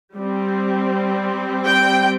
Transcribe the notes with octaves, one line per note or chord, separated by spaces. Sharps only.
G3 C4
G5